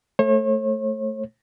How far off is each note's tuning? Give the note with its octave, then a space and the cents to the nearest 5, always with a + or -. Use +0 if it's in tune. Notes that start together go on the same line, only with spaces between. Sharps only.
A3 +0 C#5 -40